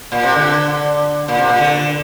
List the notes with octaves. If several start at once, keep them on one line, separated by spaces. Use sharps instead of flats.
A#2
C3
D3
A#2
C3
A#2
D3